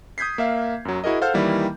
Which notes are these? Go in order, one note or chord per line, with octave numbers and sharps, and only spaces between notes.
D#6 G6 G#6 B6 C7
A#3 E5 F5
F#2 F#3
E4 F#4 G#4 A#4 D#5
A4 C5 F5 F#5 F6 G6
D#3 E3 G3 A#3 E4